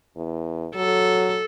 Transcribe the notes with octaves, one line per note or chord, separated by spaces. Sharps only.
E2
F#3 A4